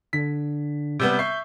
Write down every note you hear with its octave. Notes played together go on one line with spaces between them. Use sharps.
D3 B6
C3 G3 B3 G6
E5 C#6 C7